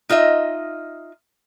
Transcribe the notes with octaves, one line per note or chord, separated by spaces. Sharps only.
D#4 F4 D#5 E5